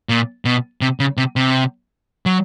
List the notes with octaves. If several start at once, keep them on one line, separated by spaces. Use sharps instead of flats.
A#2
B2
C3
C#3
C3
C3
F#3